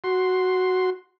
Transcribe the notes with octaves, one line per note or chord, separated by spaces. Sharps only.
F#4 C6